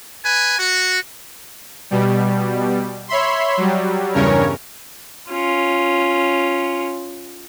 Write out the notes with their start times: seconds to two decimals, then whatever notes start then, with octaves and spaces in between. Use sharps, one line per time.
0.23 B4 G#5
0.58 F#4
1.91 B2 G3
3.08 C#5 E5 B5 C6
3.57 F#3 G3
4.14 E2 G2 C#3 C#4 A#4 C#5
5.30 C#4 F4